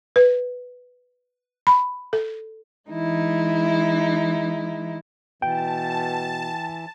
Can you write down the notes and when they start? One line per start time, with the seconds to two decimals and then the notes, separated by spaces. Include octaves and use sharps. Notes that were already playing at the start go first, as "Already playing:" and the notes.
0.16 B4
1.67 B5
2.13 A4
2.90 E3 G#3 D#4 E4
5.42 B2 E3 G5 A5